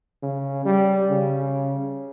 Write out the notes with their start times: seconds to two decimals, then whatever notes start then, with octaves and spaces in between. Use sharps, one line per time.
0.22 C#3
0.65 G3
1.09 C#3